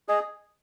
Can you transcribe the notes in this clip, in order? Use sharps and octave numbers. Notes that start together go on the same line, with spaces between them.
G#4 D#5